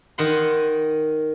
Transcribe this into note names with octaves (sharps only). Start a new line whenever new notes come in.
D#3 D#5 F#5 B5 C6